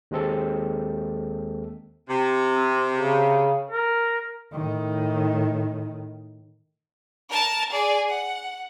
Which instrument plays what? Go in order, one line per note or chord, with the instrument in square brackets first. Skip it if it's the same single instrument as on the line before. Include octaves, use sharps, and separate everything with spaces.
[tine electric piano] D#2 G#3 C4 A4
[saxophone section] C3
[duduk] C4
C#3
A#4
[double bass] A2 D#3
[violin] A#4 A5
G#4 D5
F#5